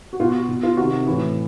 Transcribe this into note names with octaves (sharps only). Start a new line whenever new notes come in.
F#4
B2 F4
F#4
B2
F4
C3 D#3 F#4
A2 E3